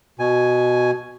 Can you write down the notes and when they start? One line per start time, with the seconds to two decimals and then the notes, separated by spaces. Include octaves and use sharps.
0.19 B2 G#5